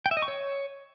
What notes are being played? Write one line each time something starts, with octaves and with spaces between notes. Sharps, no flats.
G5
E5
D#5
C#6
C#5